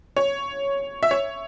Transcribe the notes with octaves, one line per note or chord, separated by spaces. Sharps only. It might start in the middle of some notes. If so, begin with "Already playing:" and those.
C#5
E5
C#5